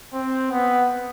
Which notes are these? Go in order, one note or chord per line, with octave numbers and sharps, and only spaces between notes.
C4
B3